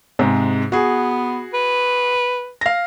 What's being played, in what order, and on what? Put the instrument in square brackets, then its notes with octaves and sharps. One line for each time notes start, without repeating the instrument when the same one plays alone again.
[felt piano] G#2 C3 G#3
[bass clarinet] B3 [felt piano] F#4 G#4
[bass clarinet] B4
[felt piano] F5 A#6